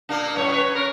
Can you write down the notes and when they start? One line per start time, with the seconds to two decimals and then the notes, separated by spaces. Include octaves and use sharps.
0.09 A#2 A#3 D4
0.36 F#2 A2 C#5
0.52 B4 C#5
0.75 C#4 A#4